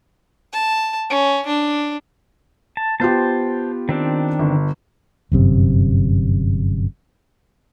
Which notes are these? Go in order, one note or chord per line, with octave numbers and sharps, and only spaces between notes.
A5
C#4
D4
A5
B3 F4 G4 C5 A5
D#3 C4 D4
G1
G1 F#2 C3